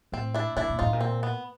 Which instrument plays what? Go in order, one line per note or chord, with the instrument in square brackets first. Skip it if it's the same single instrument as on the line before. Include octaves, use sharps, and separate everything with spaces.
[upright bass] A2 [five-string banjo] C4
[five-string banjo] D4 E4
[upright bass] B2 [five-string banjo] D4 E4
[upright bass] A#2
[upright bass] A2 [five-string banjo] D#4 F4
[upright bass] A#2
[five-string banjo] C4
B3